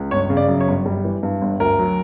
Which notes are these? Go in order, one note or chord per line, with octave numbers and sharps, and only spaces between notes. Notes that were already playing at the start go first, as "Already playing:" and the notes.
Already playing: C#2
G1 C#5
C#3
D5
F#2
C#5
G1
G3
E3
G2
G1
D2 A#4
F#3